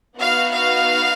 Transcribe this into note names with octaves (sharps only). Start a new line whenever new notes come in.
B3 D#4 F#4 F5
F5